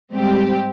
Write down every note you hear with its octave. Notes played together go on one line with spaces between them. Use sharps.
G#2 G3 C4 G4